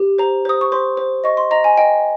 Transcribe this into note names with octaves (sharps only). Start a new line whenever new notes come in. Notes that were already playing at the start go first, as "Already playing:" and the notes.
Already playing: G4
C5 A#5
C5 D#6
C#6
C5 C6
C5
D#5 C#6
C6
D#5 A#5
G#5
D#5 G5